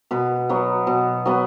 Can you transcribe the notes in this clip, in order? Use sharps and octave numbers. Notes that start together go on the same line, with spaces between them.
B2 B4
F#3 B3
B2
F#3 B3